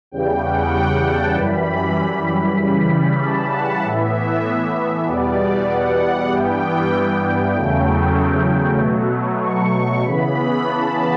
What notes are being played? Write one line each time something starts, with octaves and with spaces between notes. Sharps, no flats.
E2 C#3 G3 G5
F#5
G5
A5
F#2 E3 G3 B5
C#3 E3 G3
A5
F#5
A2 E3 B3 E5
E2 B2 G3 B3 D5
F#5
G2 E3 G3 B3 G5
E2 C#3 F#3 A3
B2 F#3 A3
C#6
C#6
C#3 E3 B3 B5
A5